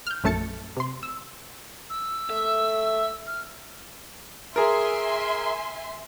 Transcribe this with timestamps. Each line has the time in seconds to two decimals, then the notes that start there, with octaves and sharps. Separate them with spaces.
0.07 F6 G6
0.24 A#1 F#2 A3 A5 A6 C#7
0.77 C3 C6
1.03 E6
1.90 E6
2.30 A3 E5
3.27 F6
4.56 G#4 A#4 E5 G#5 C6